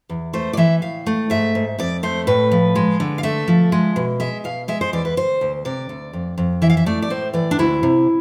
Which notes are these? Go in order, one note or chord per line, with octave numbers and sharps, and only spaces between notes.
E2
A3 C5
D5
E3 E5
A2 F5
A3
G#2 E5
G#2
F2 D5
A3 C5
A2 B4
F3
G#3
D3
F5
A3 E5
F3
G#3
B2
G#3 E5
B2 F5
G#3 E5
C5
E2 D5
B4
D2 C5
D2
C3 D5
D2
F2
F2
E3 E5
F5
E5
A3 D5
D5
A2 C5
E3 D5
D4
D2 E4
C3